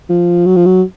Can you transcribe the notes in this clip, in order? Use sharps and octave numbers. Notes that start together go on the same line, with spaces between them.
F3
F#3
F3
F#3